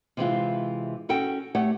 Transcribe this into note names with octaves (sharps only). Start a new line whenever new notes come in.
C3 E3 G#3 F4
C#4 F#4 A4 G5
A3 G4 C#5 F#5